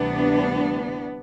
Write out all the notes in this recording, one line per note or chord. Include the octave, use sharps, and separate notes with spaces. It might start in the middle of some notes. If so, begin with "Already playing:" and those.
Already playing: D2 C3 E3 G3 B3 D4